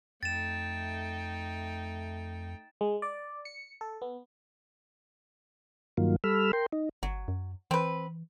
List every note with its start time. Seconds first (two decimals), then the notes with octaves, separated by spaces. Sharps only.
0.23 F2 A3 D#4 G5 A6 E7
2.81 G#3
3.02 D5
3.45 C#7
3.81 A4
4.02 B3
5.97 G2 D#3 F#3 A#3 F4
6.24 G3 A4 B5 E6 F6
6.53 A#4 G5 C6
6.72 D#4
7.03 G1 F#3
7.28 F#2
7.71 E3 C4 B4